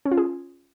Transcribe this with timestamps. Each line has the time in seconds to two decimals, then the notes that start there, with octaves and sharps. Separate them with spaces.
0.05 C#4
0.11 F4
0.17 G#4